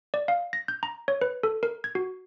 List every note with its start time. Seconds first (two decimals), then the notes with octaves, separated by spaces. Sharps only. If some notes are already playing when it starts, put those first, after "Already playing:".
0.14 D5
0.28 F5
0.53 A#6
0.68 G6
0.83 A#5
1.08 C#5
1.21 B4
1.43 A4
1.63 A#4
1.84 G#6
1.95 F#4